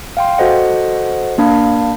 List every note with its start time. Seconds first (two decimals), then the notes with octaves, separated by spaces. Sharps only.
0.17 F5 G5 C6
0.38 F#4 A4 C5 D#5 F#5
1.38 A#3 D4 F5 B5